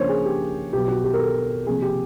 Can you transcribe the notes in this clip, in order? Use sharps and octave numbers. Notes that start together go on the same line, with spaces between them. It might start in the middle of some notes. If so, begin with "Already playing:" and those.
Already playing: C#3 F3 A#3 D4 C5 C#5
G#4
G4
B2 F#3 B3 G4
F#4
G4
A#4
A4
C3 F3 A#3 G#4
G4